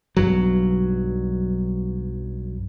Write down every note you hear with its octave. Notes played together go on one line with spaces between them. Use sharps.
B1 G2 F#3